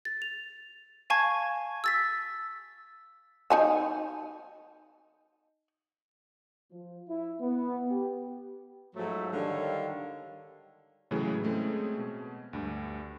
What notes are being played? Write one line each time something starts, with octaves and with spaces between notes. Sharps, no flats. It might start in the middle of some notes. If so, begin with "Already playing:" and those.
A6
F7
F5 G#5 A5 C#6 G#6
E6 A6 B6
D#4 G#5 A5
F3
E4
B3
G4
G#2 F3 F#3 A3
D3 D#3 G3 C#5 F5
A2 C#3 E3 F#3 G#3 G#4
G#3 A3 C4 C#4 G#4
B2
D2 G2